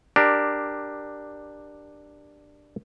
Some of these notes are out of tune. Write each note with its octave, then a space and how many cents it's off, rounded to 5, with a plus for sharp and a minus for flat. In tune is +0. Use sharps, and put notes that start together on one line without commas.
D4 +10 G4 +0 A#4 +0